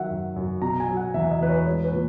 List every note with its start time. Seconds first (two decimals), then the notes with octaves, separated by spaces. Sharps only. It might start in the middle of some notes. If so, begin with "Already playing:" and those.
Already playing: D#3 F#3 E5 F#5
0.11 F#2
0.36 F#2
0.62 B2 A#5
0.80 G#5
0.88 F#3
0.97 F#5
1.14 E2 E5
1.31 D#5
1.41 E2 B4
1.49 C#5
1.66 G#3 C#5
1.84 B4
1.92 A#2